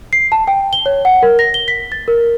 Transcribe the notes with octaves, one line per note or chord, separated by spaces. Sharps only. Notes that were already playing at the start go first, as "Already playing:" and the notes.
C7
A5
G5
G7
C#5
F#5
A#4
A#6
G7
B6
A6
A#4